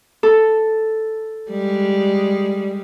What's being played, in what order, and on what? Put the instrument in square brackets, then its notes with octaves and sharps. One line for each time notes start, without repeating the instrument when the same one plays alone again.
[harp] A4
[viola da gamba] G3 G#3